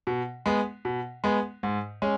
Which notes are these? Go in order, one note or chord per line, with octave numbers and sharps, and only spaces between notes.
B2
G#3 B3
B2
G#3 B3
G#2
G#3 C#4